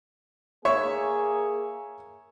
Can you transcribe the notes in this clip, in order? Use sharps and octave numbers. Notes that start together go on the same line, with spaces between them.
A#3 G#4 C#5 E5 C#6